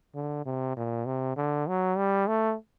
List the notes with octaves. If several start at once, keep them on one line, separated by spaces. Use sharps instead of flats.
D3
C3
A#2
C3
D3
F#3
G3
A3